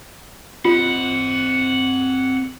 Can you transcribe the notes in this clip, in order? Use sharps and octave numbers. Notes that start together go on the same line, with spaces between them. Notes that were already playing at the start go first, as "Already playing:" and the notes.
C4 F4 D#5 F#5